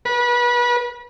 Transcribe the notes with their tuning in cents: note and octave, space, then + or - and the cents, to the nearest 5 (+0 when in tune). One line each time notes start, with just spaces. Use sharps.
B4 -30